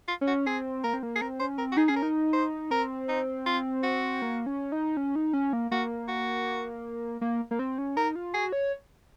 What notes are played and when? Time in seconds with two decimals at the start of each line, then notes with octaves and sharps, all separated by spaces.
0.08 F4
0.21 C#4
0.27 F#4
0.46 C4 G#4
0.84 A#3 A#4
0.94 C4
1.03 A#3
1.16 G#4
1.21 C4 A#4
1.40 C#4 C5
1.58 C4 A#4
1.72 F#4
1.77 D#4 G#4
1.88 C#4 G#4
1.96 A#4
2.02 D#4
2.33 C5
2.71 C4 A#4
3.09 D#4
3.46 F4
3.83 F#4
4.22 A#3
4.46 C#4
4.72 D#4
4.97 C#4
5.16 D#4
5.33 C#4
5.53 A#3
5.71 A#3 F#4
6.09 F#4
7.21 A#3
7.51 A#3
7.59 C4
7.78 C#4
7.97 D#4 A#4
8.15 F4
8.34 F#4 G#4
8.52 C#5